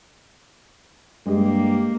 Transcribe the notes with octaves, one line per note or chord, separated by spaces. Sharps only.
G2 G#3 A#3 G4 D#5